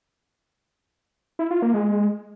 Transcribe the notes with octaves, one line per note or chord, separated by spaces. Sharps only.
E4
F4
A#3
G#3
G#3